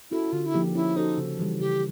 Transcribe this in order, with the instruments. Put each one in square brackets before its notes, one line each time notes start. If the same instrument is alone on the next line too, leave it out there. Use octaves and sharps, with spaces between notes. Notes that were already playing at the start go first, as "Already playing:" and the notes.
[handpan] C#4 F#4 A4 [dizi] E4
[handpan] D3 [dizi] F4
[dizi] E4
[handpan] F3 A#3 D#4 G4
[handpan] C#4 [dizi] E4
[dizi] D#4 [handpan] F#4 A4 C5
[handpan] C#3
E3 G3
[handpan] C#3 [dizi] G4